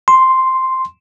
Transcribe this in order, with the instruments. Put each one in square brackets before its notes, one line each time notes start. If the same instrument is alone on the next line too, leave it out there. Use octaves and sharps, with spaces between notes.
[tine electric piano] C6